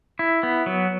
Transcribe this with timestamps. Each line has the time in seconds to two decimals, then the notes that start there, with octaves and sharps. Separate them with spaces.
0.19 E4
0.43 B3
0.66 F#3